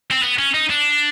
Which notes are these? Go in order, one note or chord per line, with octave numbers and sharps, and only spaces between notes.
C4
B3
C#4
D#4
D4